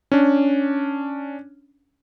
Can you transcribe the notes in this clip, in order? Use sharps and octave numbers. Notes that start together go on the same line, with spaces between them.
C#4 D4